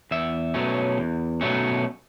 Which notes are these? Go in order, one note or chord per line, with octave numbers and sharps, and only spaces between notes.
E2 E5
B2 F#3 A3 C#4
E2
B2 F#3 A3 C#4